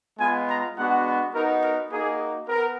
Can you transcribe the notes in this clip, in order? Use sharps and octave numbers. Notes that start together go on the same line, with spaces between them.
G#3 B3 F4 G#5
A#5
G#3 B3 D4 F#4 F#5
B3 D#4 F#4 A#4
A#4
A#3 D#4 F#4 G#4
B3 A#4